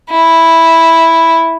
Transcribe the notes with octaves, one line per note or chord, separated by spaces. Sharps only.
E4